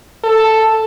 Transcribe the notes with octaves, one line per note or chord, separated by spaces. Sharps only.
A4